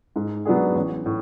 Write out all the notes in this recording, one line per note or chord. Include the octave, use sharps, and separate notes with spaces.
G#2
F#3 B3 D4 G#4
A1
A2